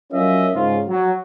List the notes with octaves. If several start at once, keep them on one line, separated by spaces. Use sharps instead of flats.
F#3 C#4 F4 A#4 D#5 E5
G#2 C#3 F4
F#3